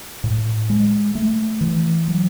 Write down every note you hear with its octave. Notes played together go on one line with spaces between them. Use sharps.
A2
G#3
A3
E3
F#3